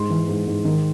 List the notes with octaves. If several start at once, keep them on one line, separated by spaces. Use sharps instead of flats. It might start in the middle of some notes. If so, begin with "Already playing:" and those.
Already playing: G#2 C6
E3
G#2
G#2
D#3